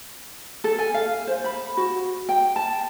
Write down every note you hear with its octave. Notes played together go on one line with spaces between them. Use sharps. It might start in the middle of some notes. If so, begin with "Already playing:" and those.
A4
G#5
F5
C5
B5
F#4
G5
A5